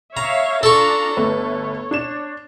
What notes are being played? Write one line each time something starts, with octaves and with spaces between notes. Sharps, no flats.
C#5 E5 F5 A#5
D4 F4 A4 A#5 C#6
G1 A3 B4 C#5
D4 E7